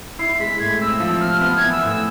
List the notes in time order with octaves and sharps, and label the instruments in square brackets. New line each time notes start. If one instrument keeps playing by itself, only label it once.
[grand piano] E4 [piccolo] C7
[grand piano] G#3 [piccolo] B6
[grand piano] A2 [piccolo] G#6
[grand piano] C4 [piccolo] E6
[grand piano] F3 [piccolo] E6
[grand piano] C3 [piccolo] F6
[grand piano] B3 [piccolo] F6
[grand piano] E3 [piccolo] G#6
[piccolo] E6
[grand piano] A2 [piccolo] E6